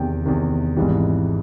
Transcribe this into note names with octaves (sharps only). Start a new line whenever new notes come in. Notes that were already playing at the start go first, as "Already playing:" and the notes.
Already playing: E2 C3 D#3 G5
E2 C3 D#3
G#1 G#2 E3 G3